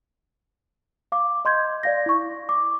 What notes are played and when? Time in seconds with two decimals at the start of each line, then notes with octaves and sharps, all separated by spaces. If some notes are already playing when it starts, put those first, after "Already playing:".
1.12 F5 D6
1.45 D#5 C6 G6 G#6
1.83 D5 F5 A#6
2.06 E4 C#6
2.49 D6